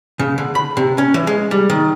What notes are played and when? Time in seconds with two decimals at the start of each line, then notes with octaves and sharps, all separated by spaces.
0.19 C#3
0.38 D3
0.55 B5
0.77 C3
0.98 C#4
1.14 E3
1.27 G#3
1.51 G3
1.70 D#3